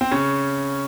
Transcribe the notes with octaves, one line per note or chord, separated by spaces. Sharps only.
C4
C#3 C#4